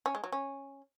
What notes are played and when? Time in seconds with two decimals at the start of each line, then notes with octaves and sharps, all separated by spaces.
0.06 C#4
0.15 G#3
0.24 F#3
0.32 C#4